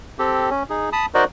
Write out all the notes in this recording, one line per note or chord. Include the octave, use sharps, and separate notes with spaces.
C4 G4 A4
C#4
D#4 G#4
A5 B5 D#6
D#4 F#4 A#4 C5 D5 D#5